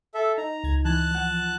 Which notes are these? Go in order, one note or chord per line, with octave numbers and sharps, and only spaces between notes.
A4 E5
D#4 A#5
C#2 G#6
E3 A5 F#6
F3 F#5